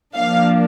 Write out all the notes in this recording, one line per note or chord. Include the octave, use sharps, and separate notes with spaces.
F3 A#3 D4 F5